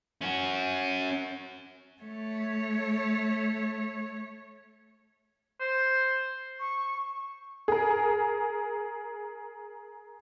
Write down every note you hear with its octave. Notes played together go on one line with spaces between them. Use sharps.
C#4 F#4
A3 C#5
C5
C#6
G#4 A#4